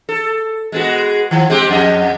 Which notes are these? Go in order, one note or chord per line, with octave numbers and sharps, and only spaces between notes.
A4
G#3 B3 F#4
D#3 F3
G#3 C4 G4
F2 D#5